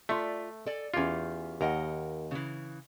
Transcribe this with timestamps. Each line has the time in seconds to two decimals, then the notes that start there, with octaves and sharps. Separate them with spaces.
0.09 A3 F4 D5 E5
0.66 A4 D5 G#5
0.94 E2 C#4 F4 G4
1.61 D#2 A#4 D#5 F#5
2.31 C#3 E3